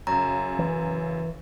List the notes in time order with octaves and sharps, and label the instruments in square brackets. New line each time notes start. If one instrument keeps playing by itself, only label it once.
[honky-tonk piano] F#2 C#3 [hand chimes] A#5
[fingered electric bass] E3